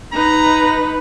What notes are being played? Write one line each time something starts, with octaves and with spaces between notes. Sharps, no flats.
D#4 B4 A#5